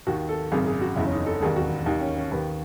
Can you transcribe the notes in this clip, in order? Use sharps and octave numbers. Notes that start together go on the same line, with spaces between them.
D#2 D#3 F#4
A4
G#1 F#2 C#3 G#4
G#4
F#4
F#1 E2 C#3 E4
C#4
D#4
A4
E1 D#2 D#3 G#4
F#4
D#2 D#3 D#4
C#4
C#4
D#2 D#3 B4